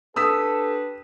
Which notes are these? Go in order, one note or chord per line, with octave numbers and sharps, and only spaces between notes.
D4 G4 A4 B4 D#6 E6 B6